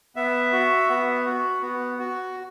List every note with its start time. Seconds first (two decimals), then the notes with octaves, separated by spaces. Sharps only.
0.16 B3 E5
0.52 F#4
0.89 B3
1.25 F#4
1.62 B3
1.99 F#4